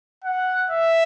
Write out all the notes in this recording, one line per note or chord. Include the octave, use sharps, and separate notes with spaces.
F#5
E5